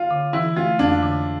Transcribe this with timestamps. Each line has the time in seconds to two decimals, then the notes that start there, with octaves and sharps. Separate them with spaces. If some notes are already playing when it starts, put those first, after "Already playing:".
Already playing: F4
0.11 D3
0.33 E3 E4
0.56 A3 F4
0.79 F2 D4
1.03 D3